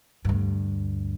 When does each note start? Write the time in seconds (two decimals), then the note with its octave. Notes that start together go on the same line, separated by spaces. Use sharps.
0.25 D2 G2